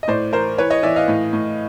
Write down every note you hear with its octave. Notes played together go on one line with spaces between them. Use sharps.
D#5
A2 C5 D5
E3 A#4 C5
E3 B4 C#5
C#5 D#5
E3 D5 E5
D#5 F5
A2
A2